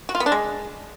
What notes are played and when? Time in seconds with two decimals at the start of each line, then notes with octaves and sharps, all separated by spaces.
0.09 F#4
0.15 F4
0.20 B3
0.26 D4
0.32 G#3